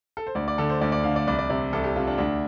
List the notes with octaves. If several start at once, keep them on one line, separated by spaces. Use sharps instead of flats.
A4
C5
D2 D5
D5
D3 A4
C5
D2 D5
D5
D3 F5
D5
C2 D5
D5
C3 D5
C2 A4
G4
C3 F4
D4
D2 D4